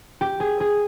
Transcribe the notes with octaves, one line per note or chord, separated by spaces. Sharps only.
G4
G#4
G#4